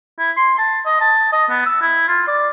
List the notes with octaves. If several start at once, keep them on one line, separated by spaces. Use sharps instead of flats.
E4
C6
A5
D#5
A5
D#5
B3
E6
E4
F4
D5